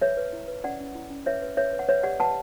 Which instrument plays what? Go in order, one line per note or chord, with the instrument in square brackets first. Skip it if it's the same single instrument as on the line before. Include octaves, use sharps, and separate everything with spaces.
[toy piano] B4 C#5 E5
B4
E4
B4
C#4 D5 F#5
C#4
E4
C#4
B4 C#5 E5
B4
B4 C#5 E5
B4
F#5
B4 C#5 E5
G4 D5 F#5
B4 F#5 A5